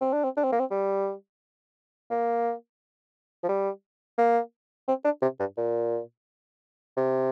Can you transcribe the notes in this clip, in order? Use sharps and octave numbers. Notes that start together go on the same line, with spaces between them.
C4
D4
C4
D4
C4
A#3
C4
G3
A#3
F3
G3
A#3
C4
D4
C3
G2
A#2
C3